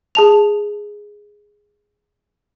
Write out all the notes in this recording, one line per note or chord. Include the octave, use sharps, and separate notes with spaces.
G#4 A5 F7